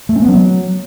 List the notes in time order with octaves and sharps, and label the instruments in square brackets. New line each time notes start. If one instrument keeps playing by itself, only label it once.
[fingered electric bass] A3
C#4
B3
F#3